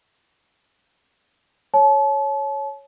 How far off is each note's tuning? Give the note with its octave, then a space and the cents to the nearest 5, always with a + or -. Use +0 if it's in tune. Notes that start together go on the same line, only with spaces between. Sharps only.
C#5 +0 A5 -35